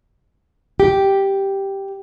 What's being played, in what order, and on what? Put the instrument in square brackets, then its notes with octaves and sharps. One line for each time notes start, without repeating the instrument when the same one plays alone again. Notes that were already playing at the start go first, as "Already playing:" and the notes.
[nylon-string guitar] G4